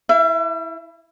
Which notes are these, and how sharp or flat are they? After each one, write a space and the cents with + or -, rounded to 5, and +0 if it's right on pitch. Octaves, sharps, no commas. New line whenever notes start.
E4 -10 E5 +40